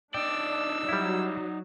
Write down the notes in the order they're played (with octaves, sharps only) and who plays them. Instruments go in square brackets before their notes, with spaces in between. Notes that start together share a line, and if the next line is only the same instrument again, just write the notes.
[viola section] D4 [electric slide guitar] D#4 D5 [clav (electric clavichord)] G5 [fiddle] E6
[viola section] F#3 [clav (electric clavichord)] G3 E4